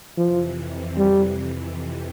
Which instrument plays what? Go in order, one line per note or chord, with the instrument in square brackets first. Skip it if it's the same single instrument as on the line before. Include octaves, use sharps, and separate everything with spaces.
[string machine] F2 C3 E3 [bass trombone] F3
[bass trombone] G3